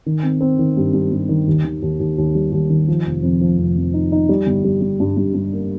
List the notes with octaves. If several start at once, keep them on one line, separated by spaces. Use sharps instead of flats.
D#3
C4
C4
D#3
G2
G2
G2
D#3
D#2
D#3
D#2
D#2
D#2
G3
D#2
D#3
F3
F1
F2
F3
F1
F2
D#4
D#4
G3
G1
G3
G3
G2
G2
G2
A#3